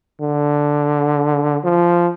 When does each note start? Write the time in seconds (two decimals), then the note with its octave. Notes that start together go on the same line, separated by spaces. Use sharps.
0.21 D3
1.64 F3